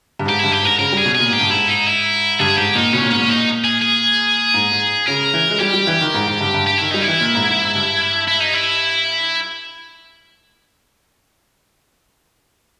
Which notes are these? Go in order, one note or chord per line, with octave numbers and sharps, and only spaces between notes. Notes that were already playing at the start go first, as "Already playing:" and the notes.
G2
G#2 G4
G2 E4
G4
G#2 A#4
C#3 A#4
G3 G#4
B2
A#2 G#4
G#2 G4
G2
G#2 E4
D#4
E4
G2 G#4
G#2 G4
A#2 D#4
B2 C#4
A#2
G#2 C#4
A#2
D#4
G#4
G#4
G#2
G#2
C#3 A#4
E3
G#3
G3 G4
G3
E3
D#3
G#2
G#2
G2
G2
G4
D#3 E4
G3 D#4
E4
E3
A#2
G#2
G#2
G#2
G2
E4
D#4
E4